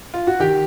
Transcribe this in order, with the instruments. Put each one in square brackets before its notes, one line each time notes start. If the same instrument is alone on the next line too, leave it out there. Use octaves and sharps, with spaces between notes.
[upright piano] F4
F#4
D#3 G4